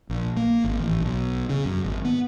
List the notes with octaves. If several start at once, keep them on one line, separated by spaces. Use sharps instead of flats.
A#1
A#3
G#1
A1
B1
C#3
F#2
G#1
B3